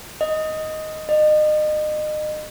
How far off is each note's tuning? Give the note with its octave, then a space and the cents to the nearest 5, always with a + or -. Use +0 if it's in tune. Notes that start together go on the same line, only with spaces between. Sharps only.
D#5 +5
D#5 -35